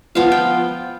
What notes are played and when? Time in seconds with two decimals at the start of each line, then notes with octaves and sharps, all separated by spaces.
0.15 F3 B3 F4 F5
0.32 G5